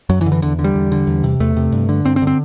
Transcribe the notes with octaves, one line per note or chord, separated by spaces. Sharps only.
F#2 F#3
E3
D3
E3
E2 D3
D3
G3
E2
D3
E2
C3
E2 A3
C3
G2
D3
G2 C4
C4
D3
C4